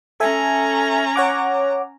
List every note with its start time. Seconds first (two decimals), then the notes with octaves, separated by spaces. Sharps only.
0.20 C#4 A4 E5 G#5 A#5
1.16 C#5 F#5 D6